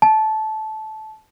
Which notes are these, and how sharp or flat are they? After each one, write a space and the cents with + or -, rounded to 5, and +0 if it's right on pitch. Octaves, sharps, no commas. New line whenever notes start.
A5 -15